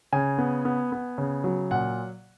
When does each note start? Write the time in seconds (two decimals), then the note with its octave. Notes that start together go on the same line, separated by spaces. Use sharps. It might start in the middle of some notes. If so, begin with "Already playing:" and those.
0.13 C#3 G#5
0.38 B3
0.65 B3
0.92 B3
1.18 C#3
1.44 F#3
1.71 A#2 F#5